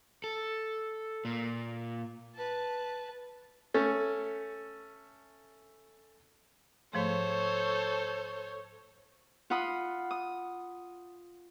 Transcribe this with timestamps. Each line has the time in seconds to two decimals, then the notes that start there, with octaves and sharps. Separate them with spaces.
0.24 A4
1.25 A#2
2.35 B4 A5
3.74 A3 C#4
6.93 G#2 F3 A3 A4 C5 C#5
9.50 F4 F#5 B5 D#6
10.11 D#6